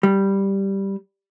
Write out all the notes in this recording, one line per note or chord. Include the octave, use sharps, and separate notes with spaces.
G3